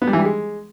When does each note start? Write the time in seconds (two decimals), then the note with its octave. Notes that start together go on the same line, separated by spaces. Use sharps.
0.02 B3
0.07 G3
0.13 E3
0.19 G3
0.25 G#3